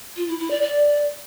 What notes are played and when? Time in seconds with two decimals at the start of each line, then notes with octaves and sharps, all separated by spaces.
0.16 F4
0.28 E4
0.39 E4
0.50 D5
0.62 D5